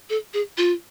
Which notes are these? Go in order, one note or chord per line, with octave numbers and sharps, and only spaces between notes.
A4
G#4
F4